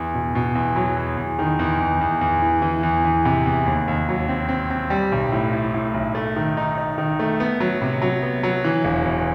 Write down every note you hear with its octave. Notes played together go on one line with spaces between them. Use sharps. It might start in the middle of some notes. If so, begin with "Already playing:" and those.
Already playing: E2
B2
B2
E2
F#3
E2
E2
D#3
E2
E2
E2
E2
E3
E3
E2
E3
C3
E2
D#2
D#2
F#3
C4
C4
C4
G3
B1
A2
A2
A2
B1
A3
D#3
D#4
D#4
D#3
A3
B3
F#3
C3
F#3
B3
F#3
E3
E1
E2